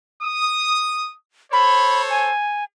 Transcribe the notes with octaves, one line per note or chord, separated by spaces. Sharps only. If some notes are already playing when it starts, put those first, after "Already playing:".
D#6
A4 C5 C#5 B5
G#5